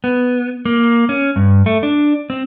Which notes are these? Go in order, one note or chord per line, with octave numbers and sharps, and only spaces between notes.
B3
A#3
C#4
G2
A3
D4
C4